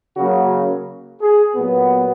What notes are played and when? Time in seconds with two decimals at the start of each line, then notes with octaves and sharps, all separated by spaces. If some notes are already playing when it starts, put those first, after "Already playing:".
0.16 C#3 F#3 A#3 F#4
1.21 G#4
1.55 A#2 F#3 B3